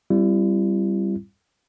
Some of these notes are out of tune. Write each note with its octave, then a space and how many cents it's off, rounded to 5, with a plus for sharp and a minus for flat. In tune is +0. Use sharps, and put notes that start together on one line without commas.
G3 +0 C4 +0 E4 +35